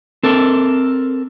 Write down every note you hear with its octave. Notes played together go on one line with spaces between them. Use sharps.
C4 A4 A#4